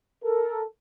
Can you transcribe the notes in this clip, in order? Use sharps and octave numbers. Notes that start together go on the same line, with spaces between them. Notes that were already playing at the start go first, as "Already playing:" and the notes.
A4 A#4